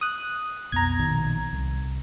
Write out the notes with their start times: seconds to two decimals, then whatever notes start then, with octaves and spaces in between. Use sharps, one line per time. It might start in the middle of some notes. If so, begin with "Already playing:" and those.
0.01 D#6 F#6
0.72 B1 F2 B3 A#5 G#6
0.99 A#1 B2 D#3
1.53 C2